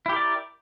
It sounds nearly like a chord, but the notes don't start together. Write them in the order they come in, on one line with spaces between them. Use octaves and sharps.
E4 G4 A#4 D5